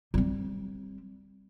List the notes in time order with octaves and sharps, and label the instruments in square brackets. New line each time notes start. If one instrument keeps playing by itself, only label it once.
[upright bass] G3 C4